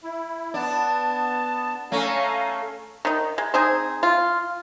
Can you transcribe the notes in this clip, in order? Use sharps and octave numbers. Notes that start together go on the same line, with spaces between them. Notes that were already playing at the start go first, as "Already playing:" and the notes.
E4
B3 D4 A5
A3 C#4 F5 G#5 A#5
D#3 D#4
G#3
C4 D#4 G#4
F4